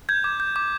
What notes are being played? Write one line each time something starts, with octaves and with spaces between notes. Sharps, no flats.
G6 G#6
D6
G6
D6